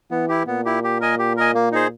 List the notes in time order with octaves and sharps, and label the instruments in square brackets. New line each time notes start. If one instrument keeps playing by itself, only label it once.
[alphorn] E3 [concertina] B3
[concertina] E4 G4
[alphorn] A#2 [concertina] B3
[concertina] E4 G4
G4
A#4 D#5 G#5
G4
A#4 D#5 G#5
A#3
D#4 G#4 C5